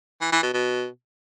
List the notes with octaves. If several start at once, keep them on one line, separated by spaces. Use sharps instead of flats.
E3
E3
B2
B2